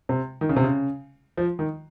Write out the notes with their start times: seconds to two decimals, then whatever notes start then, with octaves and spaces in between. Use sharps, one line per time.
0.09 C3
0.41 D#3
0.49 C#3
0.56 C3
0.64 C#3
1.37 F3
1.59 D#3